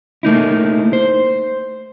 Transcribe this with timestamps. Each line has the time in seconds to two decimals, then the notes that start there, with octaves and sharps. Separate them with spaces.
0.23 A3 A#3 D#4 E4
0.93 C5